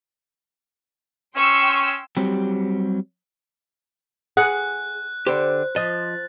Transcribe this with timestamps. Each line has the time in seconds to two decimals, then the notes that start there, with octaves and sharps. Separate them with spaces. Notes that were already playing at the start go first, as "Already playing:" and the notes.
1.36 C#4 G5 C6 C#6 E6
2.17 F#3 G3 C4 G4
4.37 G#4 F#5 F#6
5.27 D3 G4 C5
5.76 F3 D#5 A6